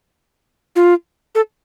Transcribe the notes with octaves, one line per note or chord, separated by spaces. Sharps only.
F4
A4